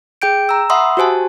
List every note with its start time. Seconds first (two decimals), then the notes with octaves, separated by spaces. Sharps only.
0.22 G#4 G5 G6 D7
0.49 A#5 E6
0.70 E5 F#5 B5 C6 D#6 E6
0.97 F#4 G4 C5 G#5 A5